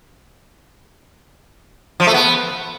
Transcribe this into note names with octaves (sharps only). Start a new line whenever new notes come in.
F3
A3
B3